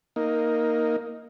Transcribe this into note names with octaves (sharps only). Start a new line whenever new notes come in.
A#3 D#4